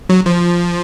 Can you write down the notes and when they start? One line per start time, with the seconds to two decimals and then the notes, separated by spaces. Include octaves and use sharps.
0.09 F#3
0.26 F3